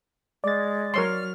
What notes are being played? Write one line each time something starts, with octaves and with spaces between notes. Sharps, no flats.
G#3 D5 A6
F#3 A#4 C#5 C6 F6